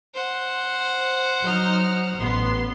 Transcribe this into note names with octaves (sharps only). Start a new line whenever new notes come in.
C5 F#5
F#3 D#4 F6
A1 B3 C6